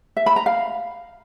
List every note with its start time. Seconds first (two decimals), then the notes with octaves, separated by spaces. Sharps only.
0.17 E5
0.26 B5
0.36 A#5
0.46 F5